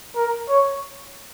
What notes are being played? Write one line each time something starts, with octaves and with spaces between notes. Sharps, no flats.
A#4
C#5